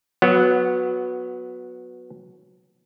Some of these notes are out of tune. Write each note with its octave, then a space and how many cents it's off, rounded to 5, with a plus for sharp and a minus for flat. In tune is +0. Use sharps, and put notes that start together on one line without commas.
F#3 -10 B3 +0